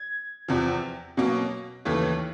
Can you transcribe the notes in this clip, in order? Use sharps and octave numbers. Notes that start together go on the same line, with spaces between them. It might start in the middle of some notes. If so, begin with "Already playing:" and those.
Already playing: G#6
E2 C3 F3
B2 F#3 A#3 C#4
D#2 C#3 E3 A3